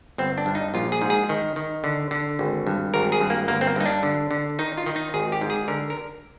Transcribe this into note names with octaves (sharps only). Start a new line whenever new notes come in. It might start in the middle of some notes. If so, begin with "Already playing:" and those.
G1 C4
D4
G2
D#4
A#1 F4
G#4
G#2
G#4
D#3
D#3
D3
D3
G#1
G2
G#1 A#4
G#4
G2
A#3
G1 A#3
C4
A#3
G2 D#4
D4
D3
D3
D#3 D#4
F4
D#3
D#4
G#1 G#4
G4
G#2
G#4
D3 A#4
A#4